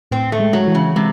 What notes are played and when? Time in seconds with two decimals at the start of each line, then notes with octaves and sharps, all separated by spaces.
0.11 A2 C4
0.32 A3
0.40 G#3
0.53 F#3
0.67 E3
0.75 C#3
0.96 C3 G#3